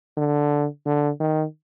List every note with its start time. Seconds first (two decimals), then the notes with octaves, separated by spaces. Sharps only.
0.17 D3
0.86 D3
1.20 D#3